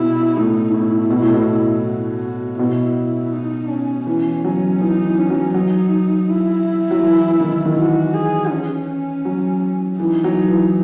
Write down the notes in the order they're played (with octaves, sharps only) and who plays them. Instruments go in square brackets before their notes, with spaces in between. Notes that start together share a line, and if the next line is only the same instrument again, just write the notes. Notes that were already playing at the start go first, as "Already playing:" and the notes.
Already playing: [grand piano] B2 [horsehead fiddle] E4
[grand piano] A2 [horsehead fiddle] D#4
[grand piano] A2 [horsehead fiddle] E4
[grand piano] B2
A2
B2
[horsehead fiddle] F#4
[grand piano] B2 [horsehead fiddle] E4
[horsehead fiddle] D#4
C#4
[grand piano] E3 [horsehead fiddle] C#4
[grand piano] F#3
[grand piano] E3 [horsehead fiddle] D#4
[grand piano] E3
[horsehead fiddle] C#4
[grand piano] F#3
[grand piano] F#3 [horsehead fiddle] D#4
[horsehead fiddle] E4
[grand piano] F#3
E3
D#3
D#3
[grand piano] E3 [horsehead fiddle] F#4
[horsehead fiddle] G#4
C#4
[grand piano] F#3
[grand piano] E3 [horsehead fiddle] D#4
[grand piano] F#3
E3